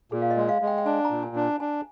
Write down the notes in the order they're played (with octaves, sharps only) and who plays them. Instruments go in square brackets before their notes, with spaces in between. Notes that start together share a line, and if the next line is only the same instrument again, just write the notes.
[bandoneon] A#2 [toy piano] G#4
[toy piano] F5
D#5
[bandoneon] G#3
[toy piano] F5
[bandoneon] G#3
[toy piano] G5
G5
[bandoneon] D4 [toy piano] G#5
[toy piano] A#5
[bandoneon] A#2
[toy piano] G#5
[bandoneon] D4
[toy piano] G#5
[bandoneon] D4 [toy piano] G#5